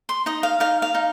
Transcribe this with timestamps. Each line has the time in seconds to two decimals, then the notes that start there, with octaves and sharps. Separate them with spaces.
0.09 C6
0.26 D#4 D#5
0.43 F5
0.60 D#4 F5
0.82 F5
0.94 D#4